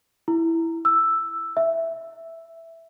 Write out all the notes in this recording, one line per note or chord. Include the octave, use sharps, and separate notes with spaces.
E4
E6
E5